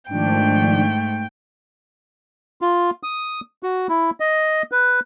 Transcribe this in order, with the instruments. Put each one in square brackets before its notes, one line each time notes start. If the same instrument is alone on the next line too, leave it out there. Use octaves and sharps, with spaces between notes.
[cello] G#2 A3 [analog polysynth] D#3 F3 D4 [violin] G5
[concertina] F4
D#6
F#4
E4
D#5
B4